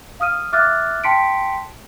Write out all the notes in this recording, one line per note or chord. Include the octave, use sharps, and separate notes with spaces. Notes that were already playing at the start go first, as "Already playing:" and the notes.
F5 D#6 F6 D#7
E5 D6 F6 F#6 A6
G5 A5 C6 B6 C#7 D7